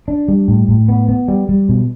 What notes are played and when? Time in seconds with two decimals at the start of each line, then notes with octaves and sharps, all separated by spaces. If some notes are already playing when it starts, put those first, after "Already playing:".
0.08 D4
0.28 G3
0.48 A2
0.68 A2
0.89 B3
1.09 B3
1.28 G3
1.49 G3
1.69 B2